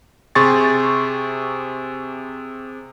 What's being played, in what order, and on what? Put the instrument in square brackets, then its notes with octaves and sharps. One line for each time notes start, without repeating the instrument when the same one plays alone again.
[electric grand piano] C3 G4 G#4 C6 C#6 A6